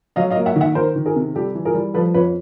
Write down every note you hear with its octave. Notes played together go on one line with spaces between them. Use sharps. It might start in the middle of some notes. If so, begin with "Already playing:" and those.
F#3 D#5 F5
D#5 F5
A#3
E5 F#5
D#3
E5 F#5
D#3 A#4 C5
D#3
G#4 A#4
C3
G3 G4 A4
E3
G#4 A#4
G3
F3 A4 B4
F2 B4 C#5